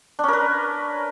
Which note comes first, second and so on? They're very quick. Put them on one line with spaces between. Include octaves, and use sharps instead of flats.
D4 C#4 A#4 B4